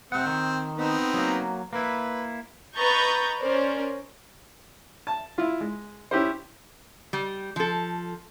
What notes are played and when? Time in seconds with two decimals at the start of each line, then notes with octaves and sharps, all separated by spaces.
0.12 C3 C4 F#5
0.26 D#3
0.78 B3 C4 D#4
1.14 F#3 A#3
1.73 A#3 E4 B4
2.76 B4 D#5 A#5 C#6 G6 A6
3.39 C#4 A#4 C5 D5
5.07 A5
5.38 E4 F4
5.60 G#3
6.11 C#4 E4 G4 C5
7.13 G3
7.56 F3 A4